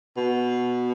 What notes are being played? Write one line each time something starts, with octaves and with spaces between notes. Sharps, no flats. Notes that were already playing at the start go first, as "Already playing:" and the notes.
B2